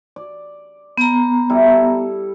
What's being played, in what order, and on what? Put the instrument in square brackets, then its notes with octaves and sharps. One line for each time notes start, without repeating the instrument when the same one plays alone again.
[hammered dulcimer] D5
[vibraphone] B3 A#5
[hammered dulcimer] G3 E4 A4